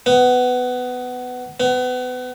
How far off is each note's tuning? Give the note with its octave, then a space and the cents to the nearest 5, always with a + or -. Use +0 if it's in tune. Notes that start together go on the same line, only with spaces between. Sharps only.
B3 +15
B3 +30